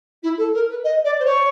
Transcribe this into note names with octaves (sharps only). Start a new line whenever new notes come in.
E4
A4
A#4
B4
D#5
D5
C5
C#5